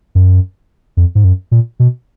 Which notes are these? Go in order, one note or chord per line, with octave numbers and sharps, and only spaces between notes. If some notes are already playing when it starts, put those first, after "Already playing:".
F#2
F2
G#2
F#2
A#2
B2